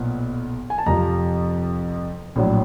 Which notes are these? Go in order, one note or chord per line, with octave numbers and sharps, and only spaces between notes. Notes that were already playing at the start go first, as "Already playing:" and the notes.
Already playing: B1 A#2 B3
G#5
A5
F2 C3 F3 A#5
A#1 A2 F#3